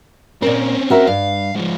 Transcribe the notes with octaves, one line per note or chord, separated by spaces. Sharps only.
A#2 C4 C#4 A#4
F#4 A#4 E5
G2 F5
G#2 F3